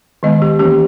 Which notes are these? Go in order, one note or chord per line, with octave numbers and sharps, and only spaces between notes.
D#3 G#3 B3 D#5
G4
E3 A#3 C#4 G4